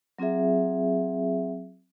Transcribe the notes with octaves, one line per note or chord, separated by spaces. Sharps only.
F#3 C4 F4 G#4 E5